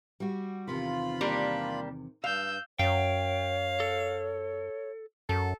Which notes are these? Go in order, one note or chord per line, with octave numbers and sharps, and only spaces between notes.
G3 F#4
E2 C3 D#3 F4 B5
G3 A#3 D4
G2 F5 E6 G6
F#2 C#5 F5 G5
A4
F#2 A4